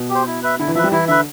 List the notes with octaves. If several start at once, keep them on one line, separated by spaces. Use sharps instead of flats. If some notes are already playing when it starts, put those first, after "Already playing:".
Already playing: B2
G4 C5
E4
B4 E5
D3 E4
E3
F3 B4 E5
G3
E3 E4
D3 B4 E5